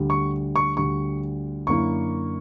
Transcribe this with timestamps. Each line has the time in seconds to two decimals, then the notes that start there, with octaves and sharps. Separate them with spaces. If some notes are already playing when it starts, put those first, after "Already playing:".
Already playing: D2 D3 G3
0.10 C#6
0.56 C#6
0.77 D2 D3 G3 C#6
1.67 F#2 D3 A#3 E4 C#6